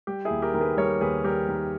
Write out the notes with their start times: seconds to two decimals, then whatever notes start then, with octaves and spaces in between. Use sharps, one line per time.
0.07 G3 G4
0.25 E4 G#4
0.30 D#2
0.42 G4 A#4
0.54 D#3 A#4
0.61 G#4 B4
0.77 G3 A#4 C#5
1.01 D#2 G#4 B4
1.24 G3 G4 A#4
1.49 D#3